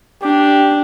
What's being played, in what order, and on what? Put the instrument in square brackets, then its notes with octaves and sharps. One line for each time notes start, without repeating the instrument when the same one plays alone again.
[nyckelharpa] D4 [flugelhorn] G4